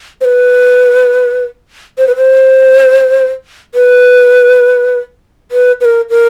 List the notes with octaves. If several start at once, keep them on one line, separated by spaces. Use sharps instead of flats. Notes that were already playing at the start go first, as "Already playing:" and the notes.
C5
B4
C5
B4
C5
B4
B4
B4
A#4
A#4